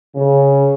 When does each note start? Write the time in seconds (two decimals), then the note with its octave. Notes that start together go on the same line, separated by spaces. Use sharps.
0.15 C#3